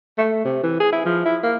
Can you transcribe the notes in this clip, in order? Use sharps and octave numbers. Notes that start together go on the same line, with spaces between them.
A3
C3
E3
G#4
E4
F3
E4
A#3